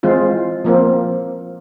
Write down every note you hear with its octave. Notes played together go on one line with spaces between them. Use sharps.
E3 G#3 C4 F4
F3 A#3 C4